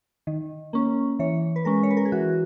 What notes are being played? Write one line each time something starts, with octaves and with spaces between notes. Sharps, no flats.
D#3
A#3 C#4
E3 C#5
B4
G#3 C#4 A#4
C#5
B4
A#4
G#4
E3 F#4